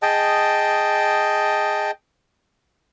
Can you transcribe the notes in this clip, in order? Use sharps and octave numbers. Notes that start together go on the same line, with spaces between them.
G#4 D#5 G5 A5